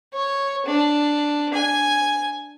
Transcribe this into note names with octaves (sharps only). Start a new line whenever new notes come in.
C#5
D4
G#5